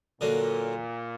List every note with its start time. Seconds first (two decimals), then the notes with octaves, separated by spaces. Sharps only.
0.21 A#2 D3 F#3 A#3